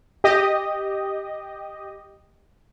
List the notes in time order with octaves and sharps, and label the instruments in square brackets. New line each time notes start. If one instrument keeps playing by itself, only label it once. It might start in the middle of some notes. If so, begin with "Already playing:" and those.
[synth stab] G4 D#5